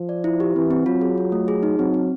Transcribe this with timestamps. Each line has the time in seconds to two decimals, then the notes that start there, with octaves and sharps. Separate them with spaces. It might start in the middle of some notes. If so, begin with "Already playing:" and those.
Already playing: F3
0.09 D5
0.24 E4
0.40 G4
0.56 E3 C4
0.70 C4
0.86 F#3 F4
1.01 G#4
1.18 F4
1.32 A3
1.48 G#4
1.63 D#4
1.78 F#3 C4
1.94 C4